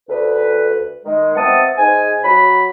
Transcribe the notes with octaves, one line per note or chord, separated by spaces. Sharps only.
D2 B4
D#3 G#3
B2 C4 E5 F#5 A5 D#6
G#2 G#5
F#3 B5